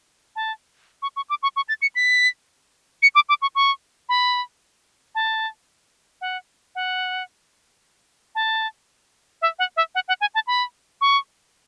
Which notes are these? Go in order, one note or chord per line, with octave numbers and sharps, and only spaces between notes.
A5
C#6
C#6
D6
C#6
C#6
A6
C#7
B6
C#7
D6
D6
C#6
C#6
B5
A5
F#5
F#5
A5
E5
F#5
E5
F#5
F#5
G#5
A5
B5
C#6